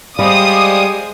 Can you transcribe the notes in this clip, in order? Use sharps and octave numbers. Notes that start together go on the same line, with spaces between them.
G3 G#3 G4 C5 D5 F5 D#6